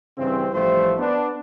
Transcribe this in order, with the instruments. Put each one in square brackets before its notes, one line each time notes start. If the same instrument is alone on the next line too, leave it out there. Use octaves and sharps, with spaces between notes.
[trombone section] G2 C#3 E3 C4
A1 F3 G3 A3 C5
B3 D4